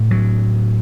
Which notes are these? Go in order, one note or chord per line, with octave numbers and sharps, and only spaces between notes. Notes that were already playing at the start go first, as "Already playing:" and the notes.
Already playing: A2
F#3